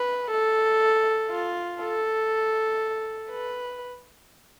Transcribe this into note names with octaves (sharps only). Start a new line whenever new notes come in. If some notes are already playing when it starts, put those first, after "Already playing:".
Already playing: B4
A4
F4
A4
B4